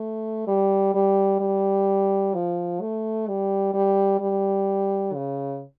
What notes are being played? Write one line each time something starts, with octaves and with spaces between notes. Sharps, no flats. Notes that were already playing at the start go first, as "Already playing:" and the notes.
Already playing: A3
G3
G3
G3
F3
A3
G3
G3
G3
C#3